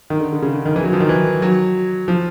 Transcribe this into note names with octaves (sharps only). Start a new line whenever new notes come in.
D#3
D3
D3
C#3
D3
D#3
E3
F#3
F3
D#3
E3
F#3
F3